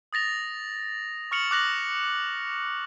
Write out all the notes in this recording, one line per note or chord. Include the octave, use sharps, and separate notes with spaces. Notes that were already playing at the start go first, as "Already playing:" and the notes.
D#6 A6 A#6 F7
C#6 F6 C#7 F7 F#7
D6 F#6 A#6 F#7